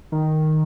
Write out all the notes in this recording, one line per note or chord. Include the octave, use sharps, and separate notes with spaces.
D#3